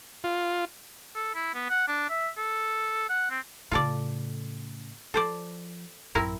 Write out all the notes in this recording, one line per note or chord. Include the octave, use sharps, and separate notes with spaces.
F4
A4
E4
B3
F#5
D4
E5
A4
F#5
C4
A2 C#3 F4 A4 D5
F3 A4 C5 D5
A1 F#2 C4 E4 A#4